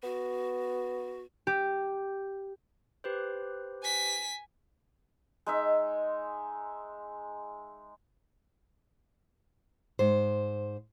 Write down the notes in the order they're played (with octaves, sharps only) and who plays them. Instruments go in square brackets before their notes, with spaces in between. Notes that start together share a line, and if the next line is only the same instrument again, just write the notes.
[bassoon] B3 [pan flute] F#4
[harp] G4
[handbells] G4 B4 C5
[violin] G#5 B6
[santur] G#3 D#4 E5
[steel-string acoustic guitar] G#2 C5